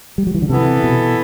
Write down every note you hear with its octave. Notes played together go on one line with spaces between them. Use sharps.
G3
F#3
E3
D3
C3 E3 B3 E4 A4
B2